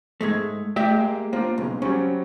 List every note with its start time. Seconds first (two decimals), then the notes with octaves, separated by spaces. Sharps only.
0.21 G#2 G#3 A3 G#6 B6
0.76 A3 G4 E5 G5
0.91 G#3 A#3
1.33 A#3 C4 D4 F4
1.58 B1 C#3 G#3
1.82 F#3 G3 C4 C#4